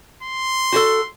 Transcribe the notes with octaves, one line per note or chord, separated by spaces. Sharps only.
C6
F#4 G4 A4